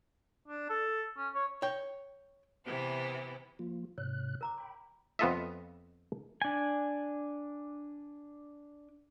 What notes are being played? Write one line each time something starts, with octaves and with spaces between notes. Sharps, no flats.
D4
A4
C#4
C#5
C#5 G5
C3 E3 B3
F3 A#3 F4
G#2 C3 C#5 F#6
A#4 A#5 D6
G5 B5
F2 B3 F4 A4 D#5 E5
D4 G#5